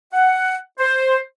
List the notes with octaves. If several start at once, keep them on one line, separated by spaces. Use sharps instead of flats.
F#5
C5